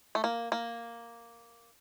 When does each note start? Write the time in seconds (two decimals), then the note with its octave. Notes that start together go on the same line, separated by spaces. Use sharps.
0.15 A3
0.24 A#3
0.52 A#3